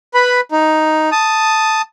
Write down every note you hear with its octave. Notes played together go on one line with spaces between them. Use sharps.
B4 B5
D#4
A5 D#6